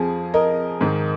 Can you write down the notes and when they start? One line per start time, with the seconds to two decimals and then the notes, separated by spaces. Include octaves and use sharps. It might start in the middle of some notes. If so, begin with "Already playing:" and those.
Already playing: F2 F3 G#4
0.34 A#4 D#5
0.81 G#2 D#3